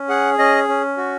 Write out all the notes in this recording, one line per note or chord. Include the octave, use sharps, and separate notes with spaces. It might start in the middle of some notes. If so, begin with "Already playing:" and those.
Already playing: C#4
G#4 F#5
C#4 D#5
C#4
F#4